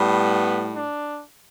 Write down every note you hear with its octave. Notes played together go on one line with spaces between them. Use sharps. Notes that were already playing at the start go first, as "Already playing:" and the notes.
Already playing: A2 G3 B3
D4